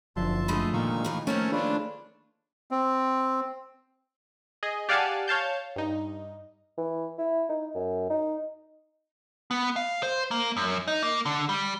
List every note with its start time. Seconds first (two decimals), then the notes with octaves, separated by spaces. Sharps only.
0.16 F#1 D3 F3 E5 A5 C6
0.48 D3 G#3 A3 B5 D#6
0.73 A#2 D#3 D#4 F5 C#6
1.04 A2 E3
1.27 A3 A#3 C4 C#4 A#4 C#5 A5
1.52 D4 F4 G#4 B4 C#5
2.71 C4
4.63 G#4 D#5
4.89 G4 D5 F5 F#5 G#5 A5
5.28 C#5 F5 A5 G6
5.76 G2 D#4
6.78 E3
7.19 E4
7.49 D#4
7.75 F#2
8.10 D#4
9.51 B3
9.76 F5
10.03 C5
10.31 A#3
10.57 F#2
10.88 D#4
11.03 A#3
11.26 D3
11.49 G3